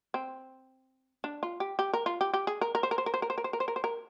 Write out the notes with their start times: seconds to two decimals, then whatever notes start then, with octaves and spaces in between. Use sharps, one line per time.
0.14 C4
1.24 D4
1.43 F4
1.60 G4
1.79 G4
1.94 A#4
2.06 F4
2.21 G4
2.33 G4
2.47 G#4
2.61 A#4
2.75 A#4
2.83 C5
2.91 A#4
2.98 C5
3.06 A#4
3.14 C5
3.22 A#4
3.30 C5
3.38 A#4
3.44 C5
3.53 A#4
3.60 C5
3.68 A#4
3.76 C5
3.84 A#4